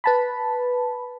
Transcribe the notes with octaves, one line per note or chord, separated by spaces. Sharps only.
B4 A5 B5